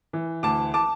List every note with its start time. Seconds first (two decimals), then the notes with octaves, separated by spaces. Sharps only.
0.13 E3
0.43 D2 A5 D6
0.74 A5 D6